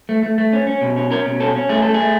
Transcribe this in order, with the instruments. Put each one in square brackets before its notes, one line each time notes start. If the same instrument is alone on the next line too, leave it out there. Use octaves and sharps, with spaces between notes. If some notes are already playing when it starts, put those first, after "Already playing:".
[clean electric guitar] A3
A3
A3
C#4
C#4
B2
C#4
C#4 A#4
B2
C#4 A4
C#4
A3 G#4
A3 A4
A3 G#4